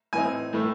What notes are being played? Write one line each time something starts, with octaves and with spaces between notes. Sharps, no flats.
A2 E3 C4 D#4 G#5
A2 E3 A3